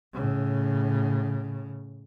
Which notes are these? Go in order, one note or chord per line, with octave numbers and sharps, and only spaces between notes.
A2 C#3